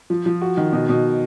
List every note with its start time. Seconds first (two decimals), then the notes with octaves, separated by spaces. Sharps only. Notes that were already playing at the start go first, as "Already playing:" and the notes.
0.10 F3
0.26 F3
0.42 F#4
0.57 D#3
0.73 B2
0.89 B2